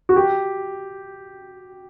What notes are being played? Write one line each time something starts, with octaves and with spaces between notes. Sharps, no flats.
F#4
G4